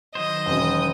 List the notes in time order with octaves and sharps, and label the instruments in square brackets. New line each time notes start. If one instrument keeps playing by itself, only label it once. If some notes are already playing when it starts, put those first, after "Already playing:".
[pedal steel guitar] D#3 F#3 C5 [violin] D#5
[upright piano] E1 C#4 [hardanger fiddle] G5 D#6